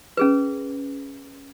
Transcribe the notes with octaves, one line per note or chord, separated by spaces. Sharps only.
C#4 G#4 B4